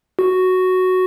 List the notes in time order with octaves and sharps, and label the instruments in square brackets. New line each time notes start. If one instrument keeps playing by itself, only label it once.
[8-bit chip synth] F#4